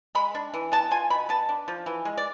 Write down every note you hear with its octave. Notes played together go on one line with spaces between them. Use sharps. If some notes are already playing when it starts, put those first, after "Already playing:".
G#3 B5
D4
E3
B3 A5
F4 G#5
B2 B5
B3 A5
D4
F3
E3
G#3
D5